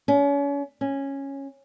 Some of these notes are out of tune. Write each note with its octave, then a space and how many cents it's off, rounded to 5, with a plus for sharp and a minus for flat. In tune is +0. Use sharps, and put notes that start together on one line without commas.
C#4 +35
C#4 -10